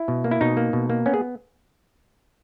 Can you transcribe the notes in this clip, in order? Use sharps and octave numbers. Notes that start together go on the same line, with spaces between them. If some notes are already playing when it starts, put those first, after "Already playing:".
Already playing: E4
B2
A#3
E4
B2 D#4
A#3
B2
A#3
B3 C#4
G#4